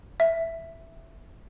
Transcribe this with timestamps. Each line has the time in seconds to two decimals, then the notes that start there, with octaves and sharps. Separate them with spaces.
0.20 E5